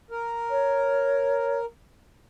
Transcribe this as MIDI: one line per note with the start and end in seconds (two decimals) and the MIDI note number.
0.11 1.65 70
0.50 1.60 73